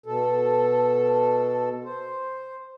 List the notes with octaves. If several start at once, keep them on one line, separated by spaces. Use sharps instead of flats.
B2 A4
C5